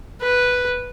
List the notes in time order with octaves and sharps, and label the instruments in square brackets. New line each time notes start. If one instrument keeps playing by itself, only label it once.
[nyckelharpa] B4